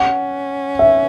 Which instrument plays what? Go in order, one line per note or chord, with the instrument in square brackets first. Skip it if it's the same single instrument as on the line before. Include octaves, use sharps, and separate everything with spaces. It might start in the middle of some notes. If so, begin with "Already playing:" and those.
Already playing: [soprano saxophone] C#4 [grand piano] F#5
[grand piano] E5